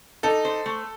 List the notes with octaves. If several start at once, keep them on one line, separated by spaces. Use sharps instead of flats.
D#4 A4
C5
A3